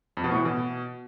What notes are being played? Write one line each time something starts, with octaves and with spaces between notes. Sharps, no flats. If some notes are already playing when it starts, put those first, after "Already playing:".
F2
B2
A2
E3
B2